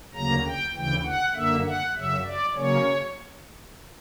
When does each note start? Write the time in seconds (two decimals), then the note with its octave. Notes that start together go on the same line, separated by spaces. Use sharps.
0.14 D2 C#3 F#3 A#3 A#5
0.45 G5
0.74 D2 C#3 E3 G5
1.05 F#5
1.35 F#2 D3 A#3 E5
1.65 F#5
1.95 F#2 C#3 F#3 E5
2.25 D5
2.55 C#3 F#3 A#3 C#4 C#5